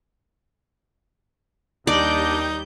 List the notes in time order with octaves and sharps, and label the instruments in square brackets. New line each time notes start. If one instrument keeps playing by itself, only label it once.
[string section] D#2 G3 G6 [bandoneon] D4 D#5 D6 [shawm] D#4 [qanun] D5